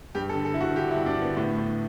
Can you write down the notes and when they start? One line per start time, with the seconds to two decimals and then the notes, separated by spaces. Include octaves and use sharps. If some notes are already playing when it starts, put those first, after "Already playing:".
0.15 G2 G4
0.29 A4
0.35 D3
0.45 A4
0.54 D3 E4
0.61 F#4
0.76 D3 G4
0.91 E4
0.96 G2
1.06 D4
1.17 D3 B3
1.37 A2
1.58 A2